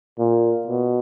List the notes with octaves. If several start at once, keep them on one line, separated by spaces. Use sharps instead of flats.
A#2
B2